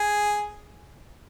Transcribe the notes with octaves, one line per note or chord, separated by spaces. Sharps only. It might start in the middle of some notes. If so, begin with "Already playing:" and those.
Already playing: G#4